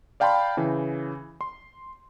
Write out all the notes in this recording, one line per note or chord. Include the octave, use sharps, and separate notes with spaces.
D5 F5 G5 A5 B5 C6
C#3 E3
C6